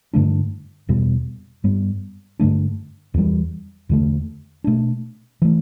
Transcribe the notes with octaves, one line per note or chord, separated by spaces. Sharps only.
G2 D3 A3 D4
E2 B2 G3 B3
G2 G3 B3
G2 D3 A3 D4
E2 E3 G3
E2 D3 A3
B2 A3 D4
E3 A3